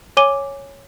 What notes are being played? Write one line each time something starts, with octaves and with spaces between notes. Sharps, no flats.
C#5 G#5 D6 D#7 G7